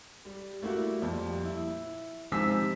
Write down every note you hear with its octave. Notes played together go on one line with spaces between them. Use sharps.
G3
G3 A3 A#3 E4 F#4
F2 A#2 G3
E4
G#2 C3 F3 G#5 E6 B6